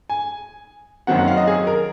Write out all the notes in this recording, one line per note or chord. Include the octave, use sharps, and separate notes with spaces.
G#5
F#2 D#3 F#3 C4 F#5
F#5
F5
D#5
G#4
A#4